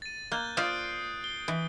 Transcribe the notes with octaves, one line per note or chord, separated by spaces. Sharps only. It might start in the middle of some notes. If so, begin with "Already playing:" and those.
A6 D#7
A#3 F#6 G6 G7
F4 C5 D5 D#6 C7 D7
G7
E3